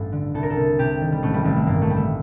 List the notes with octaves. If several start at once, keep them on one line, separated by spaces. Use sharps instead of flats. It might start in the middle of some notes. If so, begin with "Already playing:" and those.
Already playing: A1 G2 A4
D3
C2 A4
A#4
A4
C2
C3 G4
D#3
G3
A1 A3
G3
A1 G3
A3
G2 A#3
A3
D3 G3
A3